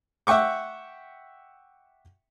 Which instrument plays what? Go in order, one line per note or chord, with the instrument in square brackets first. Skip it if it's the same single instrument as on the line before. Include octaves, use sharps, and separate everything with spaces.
[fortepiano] E5 F#5 G5 C#6 D6